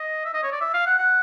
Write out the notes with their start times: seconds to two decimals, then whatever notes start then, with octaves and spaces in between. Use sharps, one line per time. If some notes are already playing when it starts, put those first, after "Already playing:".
Already playing: D#5
0.25 E5
0.34 D#5
0.43 C#5
0.52 D5
0.61 E5
0.74 F5
0.86 F#5
0.98 F#5